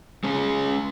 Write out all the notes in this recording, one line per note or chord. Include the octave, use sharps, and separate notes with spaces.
G#3 C#4 G#4